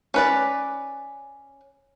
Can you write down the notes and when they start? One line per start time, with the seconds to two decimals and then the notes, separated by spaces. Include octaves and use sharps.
0.14 C#4 B4 D5